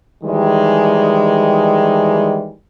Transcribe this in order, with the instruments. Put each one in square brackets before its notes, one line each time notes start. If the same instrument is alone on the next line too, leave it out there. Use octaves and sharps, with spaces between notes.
[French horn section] D#3 E3 G3 G#3